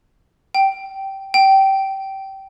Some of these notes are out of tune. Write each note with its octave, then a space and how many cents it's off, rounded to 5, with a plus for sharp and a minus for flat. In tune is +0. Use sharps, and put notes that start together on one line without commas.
G5 -15
G5 -20